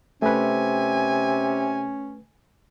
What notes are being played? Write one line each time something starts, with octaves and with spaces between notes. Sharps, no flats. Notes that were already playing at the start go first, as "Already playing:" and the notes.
C3 A3 C#4 B4 G#5